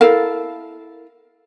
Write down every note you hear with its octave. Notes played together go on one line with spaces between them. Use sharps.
E4 A4 A#4 F5